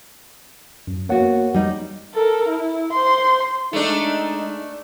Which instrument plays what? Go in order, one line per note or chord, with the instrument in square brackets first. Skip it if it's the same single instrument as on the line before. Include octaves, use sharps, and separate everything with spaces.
[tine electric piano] F#2
[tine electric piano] A#3 C#5 F#5 [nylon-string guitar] B3 F#4
[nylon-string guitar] G3 D#4
[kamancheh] A4 A#4
E4
C5 C6
[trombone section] G#3 D#4 [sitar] A3 D4